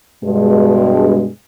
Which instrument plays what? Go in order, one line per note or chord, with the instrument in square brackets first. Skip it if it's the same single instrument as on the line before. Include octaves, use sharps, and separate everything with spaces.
[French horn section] G2 B2 G#3